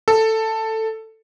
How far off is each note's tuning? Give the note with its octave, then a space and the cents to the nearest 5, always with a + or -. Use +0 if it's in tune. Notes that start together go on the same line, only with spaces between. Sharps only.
A4 +10